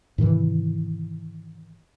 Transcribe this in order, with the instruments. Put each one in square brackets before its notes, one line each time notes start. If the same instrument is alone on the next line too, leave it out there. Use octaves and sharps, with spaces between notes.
[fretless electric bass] G#2 C3 D#3 E3